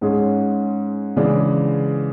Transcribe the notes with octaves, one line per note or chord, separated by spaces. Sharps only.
G#2 G#3 C#4 G#4
C#3 E3 G#3 D4